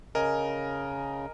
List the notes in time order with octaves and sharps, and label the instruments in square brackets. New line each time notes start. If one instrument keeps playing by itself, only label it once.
[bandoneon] C#3 [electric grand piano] A#4 D#5 G#5